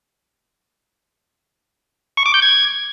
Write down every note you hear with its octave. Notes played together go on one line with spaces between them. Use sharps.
C#6
D6
G6
G#6